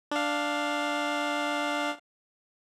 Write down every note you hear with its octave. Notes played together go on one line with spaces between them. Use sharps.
D4 F5